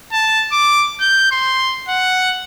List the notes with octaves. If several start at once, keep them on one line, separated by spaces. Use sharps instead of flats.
A5
D6
G6
C6
F#5